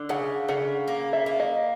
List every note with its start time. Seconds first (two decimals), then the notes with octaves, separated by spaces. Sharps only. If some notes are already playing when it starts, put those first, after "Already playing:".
Already playing: D3
0.09 C#3 F#5
0.49 C#3 F#5
0.88 A#3
1.13 E5
1.26 A#3
1.40 D#5